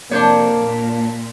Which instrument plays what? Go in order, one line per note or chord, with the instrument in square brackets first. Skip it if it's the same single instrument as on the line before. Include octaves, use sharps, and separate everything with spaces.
[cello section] F2 C3 [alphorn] A#3 [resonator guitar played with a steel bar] D4 C5 C#5
[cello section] A#2